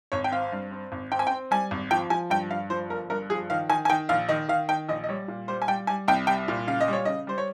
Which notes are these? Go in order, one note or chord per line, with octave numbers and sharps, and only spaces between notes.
G#1 C#5
G5
C4 F5
G2
C4
G#1
C4 G5
G#5
G5
C4
G3 G#5
G#1
F3 G5
F3 G#5
G2 G5
G2 F5
F3 C5
G1 A#4
G2 A#4
F3 G#4
D#3 F5
D#3 G#5
G#5
D#3 G5
A#1 F5
D#3 D#5
D#3 F5
D#3 G5
A#1 D#5
D#5
G3 C#5
A#2
G3 C5
G#5
G3 G5
G3 G#5
C2 G5
G3 G5
A#2
C#3 F5
D#5
G3 C#5
C#3 D#5
G3 C5
C#5